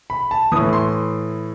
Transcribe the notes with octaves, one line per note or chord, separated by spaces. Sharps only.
B5
A5
A2 E3 D#6
C6